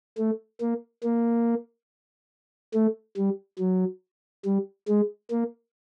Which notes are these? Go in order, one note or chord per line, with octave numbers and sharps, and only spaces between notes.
A3
A#3
A#3
A3
G3
F#3
G3
G#3
A#3